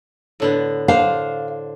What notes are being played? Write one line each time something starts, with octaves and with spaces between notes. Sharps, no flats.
A2 D3 B3
D4 C5 F5